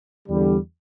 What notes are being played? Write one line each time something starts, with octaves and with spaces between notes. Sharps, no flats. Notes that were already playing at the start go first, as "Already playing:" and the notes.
E2 D3 G3